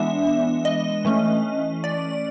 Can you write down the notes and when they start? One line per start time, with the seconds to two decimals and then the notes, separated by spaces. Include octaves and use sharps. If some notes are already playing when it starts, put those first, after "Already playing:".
Already playing: E3 G#3 B3 D4 E5
0.65 D#5
1.05 E3 A3 C#4
1.84 D5